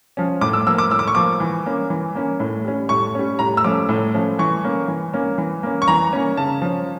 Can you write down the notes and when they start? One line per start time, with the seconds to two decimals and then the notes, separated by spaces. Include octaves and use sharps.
0.17 F3 C#4
0.41 A2 D6
0.53 E6
0.67 F3 A#3 E6
0.78 D6
0.90 A2 E6
0.99 D6
1.07 C#6
1.15 F3 A#3 D6
1.40 E3
1.66 A#3 C#4
1.90 E3
2.15 A#3 C#4
2.40 A2
2.65 G3 C#4
2.89 A2 C#6
3.15 G3 C#4
3.39 A2 A#5
3.57 E6
3.64 F3 A3 C#4 D6
3.89 A2
4.14 F3 A3 C#4
4.39 E3 C#6
4.64 A#3 C#4
4.88 E3
5.14 A#3 C#4
5.38 E3
5.63 A#3 C#4
5.82 C#6
5.88 E3 A#5
6.13 A#3 C#4
6.37 C#3 A5
6.62 F3 C#4